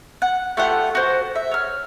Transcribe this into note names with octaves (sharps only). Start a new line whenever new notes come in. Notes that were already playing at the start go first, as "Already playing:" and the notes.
F#5
A3 F4 G4 F#5
F#4 C5
E5
C#5 F6